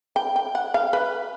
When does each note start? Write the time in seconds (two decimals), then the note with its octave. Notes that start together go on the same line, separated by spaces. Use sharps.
0.16 G5
0.36 G5
0.55 F#5
0.74 F5
0.93 B4